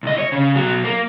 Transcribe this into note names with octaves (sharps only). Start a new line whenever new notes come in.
C2 D#5
C#5
C#3
B1 F#3
A#3